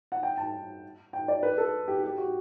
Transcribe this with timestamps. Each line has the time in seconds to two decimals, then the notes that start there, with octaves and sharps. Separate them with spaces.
0.12 F#5
0.23 G5
0.37 A5
1.13 G5
1.28 D5
1.43 B4
1.58 A4
1.88 G4
2.04 G4
2.18 F#4